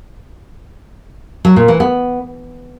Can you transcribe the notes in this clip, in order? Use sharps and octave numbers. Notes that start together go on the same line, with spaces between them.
F#3
A#2
E3
B3